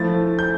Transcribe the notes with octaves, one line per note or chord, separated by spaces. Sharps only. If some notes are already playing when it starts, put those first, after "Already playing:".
Already playing: F3 A3 E4 A6
G6